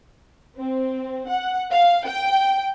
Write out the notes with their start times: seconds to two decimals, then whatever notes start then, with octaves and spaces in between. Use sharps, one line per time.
0.57 C4
1.29 F#5
1.71 F5
2.05 G5